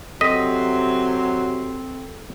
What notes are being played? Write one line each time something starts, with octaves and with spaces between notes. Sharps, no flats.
C3 F#3 C4 A4 D#5 B6